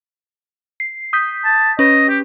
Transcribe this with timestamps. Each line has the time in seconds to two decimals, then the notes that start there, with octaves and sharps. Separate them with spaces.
0.80 C7
1.13 D#6 G6 B6
1.45 A5
1.79 C#4 B4 D#5
2.09 G4